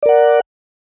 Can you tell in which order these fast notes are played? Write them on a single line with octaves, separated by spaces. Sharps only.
D5 A#4 F#5